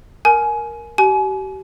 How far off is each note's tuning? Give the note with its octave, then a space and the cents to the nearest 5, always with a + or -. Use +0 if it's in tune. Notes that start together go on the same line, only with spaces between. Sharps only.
A#4 +0 G#5 +25
G4 -35 G#5 +35